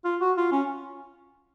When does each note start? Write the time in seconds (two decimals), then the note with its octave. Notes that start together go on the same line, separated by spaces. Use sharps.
0.05 F4
0.21 F#4
0.37 F4
0.52 C#4